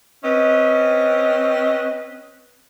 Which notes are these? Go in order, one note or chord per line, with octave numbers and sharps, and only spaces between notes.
C4 C#4 B4 D#5